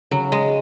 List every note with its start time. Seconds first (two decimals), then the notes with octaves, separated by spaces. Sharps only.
0.11 C#3 F#3
0.32 G#3